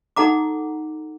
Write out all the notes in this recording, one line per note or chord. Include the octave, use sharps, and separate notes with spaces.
D#4 A4 F#5 A#5 D6